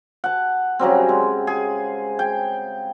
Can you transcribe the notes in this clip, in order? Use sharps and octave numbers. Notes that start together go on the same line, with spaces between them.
F#5 A5
C#3 F#3 G3 C4
G#3
G#4
G5